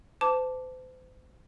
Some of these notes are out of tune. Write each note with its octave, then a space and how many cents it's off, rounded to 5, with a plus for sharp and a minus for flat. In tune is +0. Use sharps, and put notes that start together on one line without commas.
C5 -40 A5 +5 D6 -10